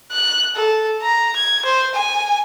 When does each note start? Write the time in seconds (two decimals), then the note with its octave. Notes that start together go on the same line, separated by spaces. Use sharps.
0.12 F#6
0.56 A4
1.02 A#5
1.36 G#6
1.65 C5
1.95 G#5